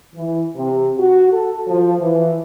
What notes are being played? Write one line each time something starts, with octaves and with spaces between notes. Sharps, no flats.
E3
C3
F#4
A4
F3
E3